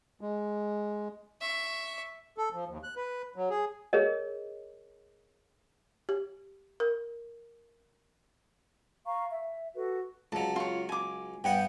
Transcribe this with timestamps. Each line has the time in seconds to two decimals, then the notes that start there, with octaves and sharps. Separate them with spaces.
0.21 G#3
1.41 E5 C#6
2.38 A4
2.53 F3
2.68 D#2
2.84 F#6
2.97 B4
3.36 F#3
3.50 G#4
3.93 G#4 A#4 C#5 D#5
6.09 G4
6.80 A#4
9.06 F5 A#5 C#6
9.31 E5
9.75 F#4 A4 B4
10.32 C#2 F#3 A5
10.56 F4 C#5
10.89 G#5 D6
11.44 G2 B3 F#5 G5